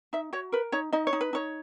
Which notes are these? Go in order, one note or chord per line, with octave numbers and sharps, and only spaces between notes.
D#4 E5
F#4 C#5
A#4 B4
D#4 C#5
D#4 D#5
C#5
D#4
B4
D#4 C#5